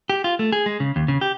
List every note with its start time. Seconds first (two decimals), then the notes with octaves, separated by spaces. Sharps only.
0.10 G4
0.24 F4
0.39 A3
0.52 G#4
0.66 G#3
0.80 C#3
0.96 D#2
1.08 C#3
1.21 G4